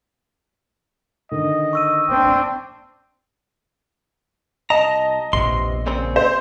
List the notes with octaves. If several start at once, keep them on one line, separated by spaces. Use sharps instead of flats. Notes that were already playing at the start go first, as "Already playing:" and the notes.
D3 D#3 D#5
C#6 E6 D#7
C4 D4 G5
C2 D#5 A5 A#5
A#1 E2 C3 C6
A#2 C#3 C4
C5